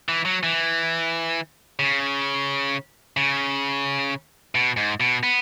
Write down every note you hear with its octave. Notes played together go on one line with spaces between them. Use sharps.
E3
F#3
E3
C#3
C#3
B2
G#2
B2
B3